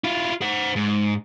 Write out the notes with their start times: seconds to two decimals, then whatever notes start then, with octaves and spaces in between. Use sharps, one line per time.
0.04 E4 F4
0.42 C5 F#5
0.76 G#2